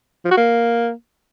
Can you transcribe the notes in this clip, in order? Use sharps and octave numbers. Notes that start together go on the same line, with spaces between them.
F3
F#4
A#3